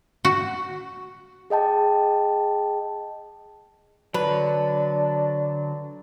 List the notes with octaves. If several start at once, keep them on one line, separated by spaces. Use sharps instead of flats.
F#4
G#4 D#5 G5 A5
D3 F#3 D4 B4